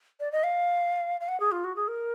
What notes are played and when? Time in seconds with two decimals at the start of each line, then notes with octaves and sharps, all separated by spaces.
0.20 D5
0.32 D#5
0.44 F5
1.21 F5
1.28 F#5
1.40 G#4
1.52 F4
1.64 F#4
1.76 G#4
1.88 A#4